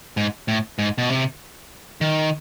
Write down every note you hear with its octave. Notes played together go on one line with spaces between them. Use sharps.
G#2
A2
G#2
B2
C3
D#3